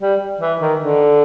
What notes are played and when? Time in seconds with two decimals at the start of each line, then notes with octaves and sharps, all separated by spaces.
0.01 G3
0.41 E3
0.60 D#3
0.80 D3